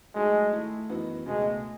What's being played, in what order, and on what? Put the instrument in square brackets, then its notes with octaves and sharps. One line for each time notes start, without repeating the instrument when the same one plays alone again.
[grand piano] G#2 F#3 A3 D#4 F#4 [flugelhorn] G#3
[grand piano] D#3 A3 E4
F#2 E3 B3 D#4 F#4
[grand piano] C#2 B2 A3 [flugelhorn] G#3